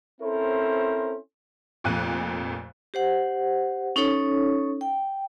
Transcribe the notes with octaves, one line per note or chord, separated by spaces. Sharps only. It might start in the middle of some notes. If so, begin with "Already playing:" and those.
C4 C#4 E4 A4 A#4 C5
F1 F2 A#2 F#6 D#7
G4 C5 F#5
C#4 D#4 A4 C#5
G5